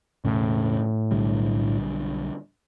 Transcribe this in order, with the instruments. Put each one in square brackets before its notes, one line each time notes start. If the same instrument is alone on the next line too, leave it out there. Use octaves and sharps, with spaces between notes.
[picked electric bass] E1 C#3 [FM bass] A2
[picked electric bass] B1 D3 G3